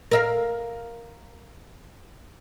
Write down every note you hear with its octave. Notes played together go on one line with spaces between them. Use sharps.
A#4 E5 F5